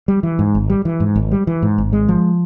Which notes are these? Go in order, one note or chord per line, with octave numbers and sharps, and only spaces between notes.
G3
E3
G#2
G#1
G3
E3
G#2
G#1
G3
E3
G#2
G#1
G#3
F3